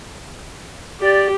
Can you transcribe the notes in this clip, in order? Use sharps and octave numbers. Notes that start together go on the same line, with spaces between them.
G4 D5